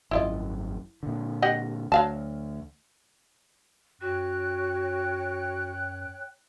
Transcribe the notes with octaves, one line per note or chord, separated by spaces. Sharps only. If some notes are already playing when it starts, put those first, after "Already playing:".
G#1 F#2 E4 F4 D#5
A#2 D3
G4 D#5 F#5
D2 F#3 F5 A5
F#2 F#4 C#5 G5 F#6